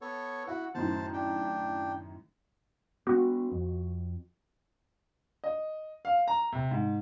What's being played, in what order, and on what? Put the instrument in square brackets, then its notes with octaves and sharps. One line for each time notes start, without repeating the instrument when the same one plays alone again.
[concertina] B3 A4 C#5
[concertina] E4 F#4 [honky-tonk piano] F#5
[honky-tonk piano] F#2 A2 D#3 [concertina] C5 A5
[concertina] D4 G5
[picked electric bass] B3 D4 [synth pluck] F#4
[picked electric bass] F2
[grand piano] D#5
F5
A#5
C3
G#2